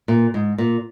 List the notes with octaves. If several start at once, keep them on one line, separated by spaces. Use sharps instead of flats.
A#2
G#2
A#2